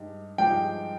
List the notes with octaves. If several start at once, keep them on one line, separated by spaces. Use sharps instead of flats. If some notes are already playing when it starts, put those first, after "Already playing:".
Already playing: G2 G#3 D#4 G4
G2 F3 G#3 D#4 G4 G5